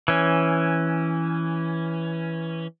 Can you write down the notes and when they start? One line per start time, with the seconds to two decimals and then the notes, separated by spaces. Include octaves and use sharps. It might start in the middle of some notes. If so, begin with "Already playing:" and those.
0.08 E3 C#4